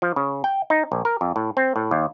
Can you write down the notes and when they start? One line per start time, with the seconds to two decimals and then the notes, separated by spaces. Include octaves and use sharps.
0.02 F3
0.16 C#3
0.44 G5
0.70 D#4
0.92 A#1
1.05 A#4
1.21 F2
1.36 A2
1.57 C4
1.76 A2
1.91 D#2